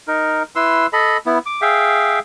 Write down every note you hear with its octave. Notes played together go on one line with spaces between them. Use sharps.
D#4 A#4
E4 B4 C6 E6
A4 D#5 B5
B3 E4
D6
G#4 E5 F5 G5